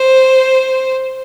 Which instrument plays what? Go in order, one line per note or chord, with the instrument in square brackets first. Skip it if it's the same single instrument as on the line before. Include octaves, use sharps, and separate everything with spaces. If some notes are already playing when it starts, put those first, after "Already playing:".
Already playing: [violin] C5